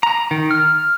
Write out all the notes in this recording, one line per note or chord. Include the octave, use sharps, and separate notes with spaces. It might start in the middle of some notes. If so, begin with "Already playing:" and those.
A#5
D#3
F6